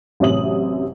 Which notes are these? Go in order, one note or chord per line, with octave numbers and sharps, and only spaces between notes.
A1 F#2 C3 E5 D#6 F#7